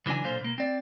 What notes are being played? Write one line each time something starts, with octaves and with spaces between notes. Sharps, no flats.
C#3 E3 F#3 D4 G#5
B1 A#2 D3 F4 C5
B2 A#3
C4 D5